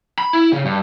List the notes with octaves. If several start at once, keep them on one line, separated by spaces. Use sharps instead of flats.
B5
E4
C#3
G2